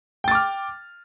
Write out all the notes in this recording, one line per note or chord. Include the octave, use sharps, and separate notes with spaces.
G5 D6 F6 A6